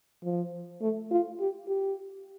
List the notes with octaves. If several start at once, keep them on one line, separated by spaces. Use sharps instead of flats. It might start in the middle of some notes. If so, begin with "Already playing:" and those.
F3
A3
F4
G4
G4